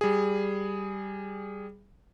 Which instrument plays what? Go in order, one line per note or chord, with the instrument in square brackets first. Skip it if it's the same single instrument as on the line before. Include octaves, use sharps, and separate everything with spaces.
[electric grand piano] G3 G#4